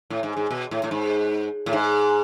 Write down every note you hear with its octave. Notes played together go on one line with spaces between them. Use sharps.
A2
G#2
G#2
B2
A2
A2
G#2
A2
G#2